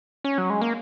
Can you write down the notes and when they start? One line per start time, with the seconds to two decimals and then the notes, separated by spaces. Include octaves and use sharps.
0.24 C#4
0.38 F#3
0.50 G#3
0.61 A#3